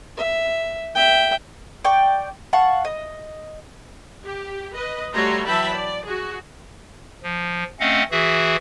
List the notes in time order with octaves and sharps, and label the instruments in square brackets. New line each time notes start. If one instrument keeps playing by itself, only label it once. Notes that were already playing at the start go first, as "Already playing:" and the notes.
[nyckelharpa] E5
E5 G5
[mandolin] D5 G5 C#6
F5 F#5 A5 C#6
D#5
[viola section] G4
B4 D#5
G3 A3 F#4 C#5 A#5 C6
E3 F#3 E5 G5 A5 B5
D5
F#4 G#4
[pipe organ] F3
A3 C4 C#4 D#5 F5 F#5
E3 F#4 G#4 E5